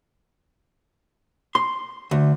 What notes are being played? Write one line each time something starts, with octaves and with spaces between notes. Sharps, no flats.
C6
D2